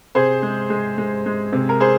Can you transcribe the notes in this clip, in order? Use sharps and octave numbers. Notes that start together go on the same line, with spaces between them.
C3 G#4 C5
G#3
G#3
G#3
G#3
C3
A#4
G#4 C5